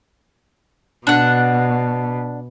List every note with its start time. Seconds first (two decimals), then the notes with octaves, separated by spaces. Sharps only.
1.07 B2 D4 F#5